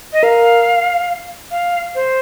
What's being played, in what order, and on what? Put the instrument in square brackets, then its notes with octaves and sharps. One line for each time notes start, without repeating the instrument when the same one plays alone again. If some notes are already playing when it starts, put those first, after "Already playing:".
[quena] D#5
[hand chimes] A#4 [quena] F5
[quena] F5
C5